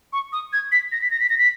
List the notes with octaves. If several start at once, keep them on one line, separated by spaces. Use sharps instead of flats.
C#6
D#6
G#6
B6
A#6
B6
A#6
B6
A#6
B6